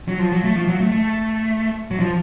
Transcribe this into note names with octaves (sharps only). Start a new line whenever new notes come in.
F#3
F3
F#3
A3
F3
F#3
A3
A3
F#3
F3